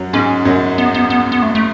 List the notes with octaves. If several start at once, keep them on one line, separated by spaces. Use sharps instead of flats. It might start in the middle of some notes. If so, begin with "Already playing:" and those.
Already playing: F#2 F#3
G#2 G#3 C#4
F#2 F#3
B3
B3
B3
B3
A3
A3